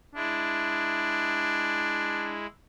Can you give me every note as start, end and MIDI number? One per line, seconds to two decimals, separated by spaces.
0.15 2.47 56
0.15 2.37 62
0.15 2.47 64